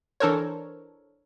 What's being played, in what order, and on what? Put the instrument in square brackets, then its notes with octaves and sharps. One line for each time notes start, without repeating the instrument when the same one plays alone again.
[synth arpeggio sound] E3 D4 A4 A#4 C5 C#5